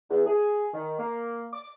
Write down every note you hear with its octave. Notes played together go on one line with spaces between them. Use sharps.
E2
G#4
D#3
A#3
D6